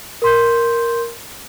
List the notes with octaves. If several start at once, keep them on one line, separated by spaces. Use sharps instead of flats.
A#4 C6 G6